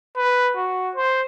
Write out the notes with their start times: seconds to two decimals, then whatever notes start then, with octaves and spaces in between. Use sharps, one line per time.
0.17 B4
0.57 F#4
0.96 C5